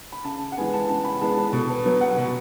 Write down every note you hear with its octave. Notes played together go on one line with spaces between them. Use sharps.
B5
C#3 A5
F#5
E3 G#3 B3 G#5
A5
C#3 A5
B5
E3 G#3 B3 A5
B4
B2 A4
B4
F#3 B3
F#5
B2